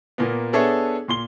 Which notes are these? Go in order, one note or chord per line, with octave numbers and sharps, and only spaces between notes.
A#2 A#3 B3
B3 D4 G#4 A4 C#5 E5
A#2 C6 G7